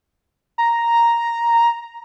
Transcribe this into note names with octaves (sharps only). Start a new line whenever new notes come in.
A#5